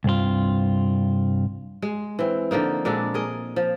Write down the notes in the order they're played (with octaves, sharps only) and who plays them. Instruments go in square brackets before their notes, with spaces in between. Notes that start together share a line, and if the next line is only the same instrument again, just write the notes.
[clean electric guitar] C2 G2 C4 F4
[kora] G#3
E3 C4
D3 F3 A#3 D#4
A#2 G#3 D4 A4
G#4 A#4 D#5
F3